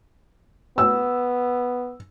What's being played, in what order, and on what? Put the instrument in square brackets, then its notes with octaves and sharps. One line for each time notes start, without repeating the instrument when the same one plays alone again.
[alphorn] B3 [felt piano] E6